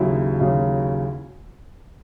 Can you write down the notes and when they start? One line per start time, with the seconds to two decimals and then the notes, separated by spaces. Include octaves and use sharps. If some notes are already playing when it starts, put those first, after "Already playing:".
Already playing: D#2 C#3 F#3 E4
0.39 D#2 C#3 F#3